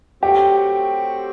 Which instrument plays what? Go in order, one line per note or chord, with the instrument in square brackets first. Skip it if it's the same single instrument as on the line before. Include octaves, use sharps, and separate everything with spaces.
[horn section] F#3 A3 C4 F#4 [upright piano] G4